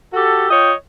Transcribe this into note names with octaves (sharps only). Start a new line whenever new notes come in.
F#4 G4 A4
F4 C#5 D#5 G5